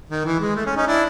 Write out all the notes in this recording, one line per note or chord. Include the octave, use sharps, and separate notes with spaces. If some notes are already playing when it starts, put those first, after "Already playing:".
D#3
E3
G#3
A3
C#4
C#4 D#4
D4 E4